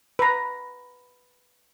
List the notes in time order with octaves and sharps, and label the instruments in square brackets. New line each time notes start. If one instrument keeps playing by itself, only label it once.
[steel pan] B4 A#5